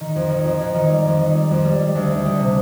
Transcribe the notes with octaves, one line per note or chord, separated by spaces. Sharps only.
D#3
F2
D#3
F2
F2
D#3
G3
F2
D#3
G3
F2
G3
G3
D2
D2
D2
C3